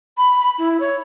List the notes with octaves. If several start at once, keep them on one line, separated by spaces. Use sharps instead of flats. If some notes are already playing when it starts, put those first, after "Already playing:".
B5
E4
C#5